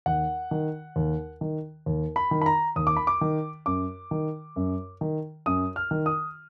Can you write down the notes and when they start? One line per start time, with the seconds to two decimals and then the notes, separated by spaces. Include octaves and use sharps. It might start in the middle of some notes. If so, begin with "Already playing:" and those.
0.06 D#2 F#5
0.51 D#3
0.96 D#2
1.41 D#3
1.86 D#2
2.16 B5
2.31 D#3
2.42 B5
2.46 A#5
2.76 D#2 D#6
2.87 D6
2.97 B5
3.07 D6
3.21 D#3
3.66 F#2 D6
4.11 D#3
4.56 F#2
5.01 D#3
5.46 F#2 D#6
5.76 F6
5.91 D#3
6.06 D#6